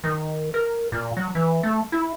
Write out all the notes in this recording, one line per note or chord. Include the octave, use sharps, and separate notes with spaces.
D#3
A#4
A#2
F#3
E3
A3
E4